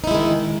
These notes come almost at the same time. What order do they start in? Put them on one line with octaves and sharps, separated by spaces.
D#4 E4 G#3 D#3